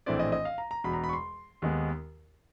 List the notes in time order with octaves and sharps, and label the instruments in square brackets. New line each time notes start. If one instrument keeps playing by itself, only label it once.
[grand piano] A#1 A2 E3 A3 C4 D5
D#5
D#5
F5
A#5
A#5
E1 E2 B2 B5
A#5
B5
C#6
C6
D#2 D#3 G#3 B3